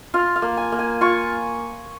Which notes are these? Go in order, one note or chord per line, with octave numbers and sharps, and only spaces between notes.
F4 F5
F5
A#3
G#5
A#3
G#5
F4 C#6